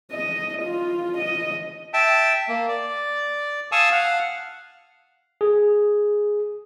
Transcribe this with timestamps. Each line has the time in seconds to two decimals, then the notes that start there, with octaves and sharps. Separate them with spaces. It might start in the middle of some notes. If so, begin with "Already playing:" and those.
0.12 D#5
0.63 F4
1.19 D#5
1.93 E5 G5 A5
2.48 A#3
2.68 D5
3.72 F5 G#5 A5 C#6 D#6 E6
3.92 F5 F#5
5.41 G#4